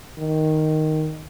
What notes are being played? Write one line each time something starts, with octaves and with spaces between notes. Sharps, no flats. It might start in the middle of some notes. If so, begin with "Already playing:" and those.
D#3